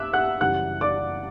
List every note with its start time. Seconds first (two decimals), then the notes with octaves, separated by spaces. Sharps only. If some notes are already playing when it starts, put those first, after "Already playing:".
Already playing: G2 E5 D6 E6 F#6
0.13 F#5 F#6
0.41 F#2 C#3 E3 G3 C#4 F#5 F#6
0.81 D5 D6